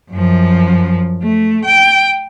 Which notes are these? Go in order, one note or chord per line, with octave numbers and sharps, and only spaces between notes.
F#2 F3
A3
G5